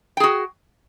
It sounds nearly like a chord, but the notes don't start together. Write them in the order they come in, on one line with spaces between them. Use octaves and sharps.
G5 G#4 F#4